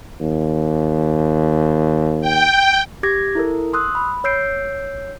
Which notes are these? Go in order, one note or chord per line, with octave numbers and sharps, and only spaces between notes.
D#2
G5
G4 D6 G#6 A#6
E4 A4 A#4
C6 D#6 E6 F#6
B5
C#5 E6 G6 C7 D7